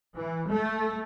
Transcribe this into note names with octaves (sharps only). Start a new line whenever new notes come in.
E3
A3